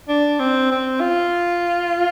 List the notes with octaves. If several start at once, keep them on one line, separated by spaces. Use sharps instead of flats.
D4
C4
C4
F4